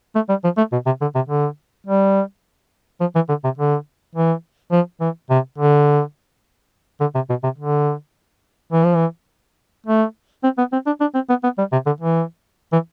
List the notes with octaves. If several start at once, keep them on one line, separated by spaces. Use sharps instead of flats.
A3
G3
F3
A3
B2
C3
D3
C3
D3
G3
F3
E3
D3
C3
D3
E3
F3
E3
C3
D3
D3
C3
B2
C3
D3
E3
F3
E3
A3
C4
B3
C4
D4
D4
C4
B3
B3
G3
C3
D3
E3
E3